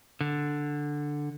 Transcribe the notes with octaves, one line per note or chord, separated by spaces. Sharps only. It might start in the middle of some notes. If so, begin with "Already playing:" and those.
D3